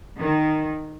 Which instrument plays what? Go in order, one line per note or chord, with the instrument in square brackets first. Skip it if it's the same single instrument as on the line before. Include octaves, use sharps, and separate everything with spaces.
[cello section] D#3